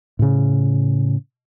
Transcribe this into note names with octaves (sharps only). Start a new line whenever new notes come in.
A2 C#3